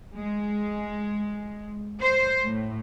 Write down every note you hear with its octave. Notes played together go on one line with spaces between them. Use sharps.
G#3
C5
A2